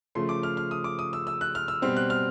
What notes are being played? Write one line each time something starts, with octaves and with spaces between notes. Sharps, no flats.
C#3 F3 A3 C6
D6
F6
F6
D#6
D6
D#6
E6
E6
F#6
F6
E6
B2 G3 C4 F6
F#6
F6